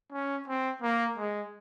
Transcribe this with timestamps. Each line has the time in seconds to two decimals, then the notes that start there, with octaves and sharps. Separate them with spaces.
0.12 C#4
0.48 C4
0.82 A#3
1.17 G#3